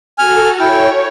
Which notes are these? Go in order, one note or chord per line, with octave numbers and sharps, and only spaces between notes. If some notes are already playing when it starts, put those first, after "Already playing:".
F#4 A4 G#5 F6
E4 C#5 G5